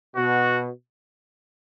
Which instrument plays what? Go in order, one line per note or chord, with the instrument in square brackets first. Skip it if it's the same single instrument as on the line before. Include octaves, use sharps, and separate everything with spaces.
[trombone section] B2 [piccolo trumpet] F#4